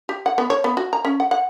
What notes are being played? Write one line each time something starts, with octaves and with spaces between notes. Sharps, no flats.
G4
F#5
B3
C#5
B3
F#4
A#5
C#4
F#5
F#5